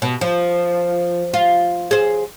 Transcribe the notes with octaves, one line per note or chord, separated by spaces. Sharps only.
B2
F3
F4
G#4 C5